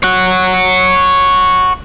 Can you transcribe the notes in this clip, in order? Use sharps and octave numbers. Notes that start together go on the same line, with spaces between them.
C#5 F#5